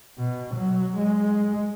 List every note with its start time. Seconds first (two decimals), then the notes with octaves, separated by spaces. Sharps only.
0.18 B2
0.54 F#3
0.97 G#3